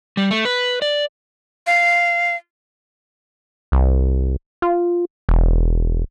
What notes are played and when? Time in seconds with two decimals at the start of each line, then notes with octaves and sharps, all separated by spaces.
0.17 G3
0.31 A3
0.45 B4
0.82 D5
1.67 F5
3.72 C2
4.62 F4
5.29 E1